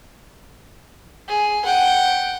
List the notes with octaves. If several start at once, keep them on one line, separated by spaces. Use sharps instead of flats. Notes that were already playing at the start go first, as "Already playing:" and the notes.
G#4
F#5 G5